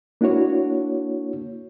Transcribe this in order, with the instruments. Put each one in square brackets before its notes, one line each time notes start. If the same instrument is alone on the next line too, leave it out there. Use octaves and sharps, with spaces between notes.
[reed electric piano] A#3 D4 E4 F#4 C#5